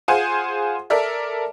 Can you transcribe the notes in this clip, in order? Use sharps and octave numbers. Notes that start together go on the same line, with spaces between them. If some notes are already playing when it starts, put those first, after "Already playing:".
F4 G#4 C5 F#5 G#5 C6
A4 A#4 D5 E5